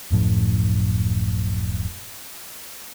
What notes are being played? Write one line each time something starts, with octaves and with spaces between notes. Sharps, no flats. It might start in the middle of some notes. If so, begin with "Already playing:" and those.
D1 F#2 A2 F3